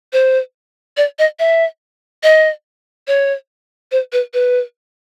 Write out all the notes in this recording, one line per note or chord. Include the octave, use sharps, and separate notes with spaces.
C5
D5
D#5
E5
D#5
C#5
C5
B4
B4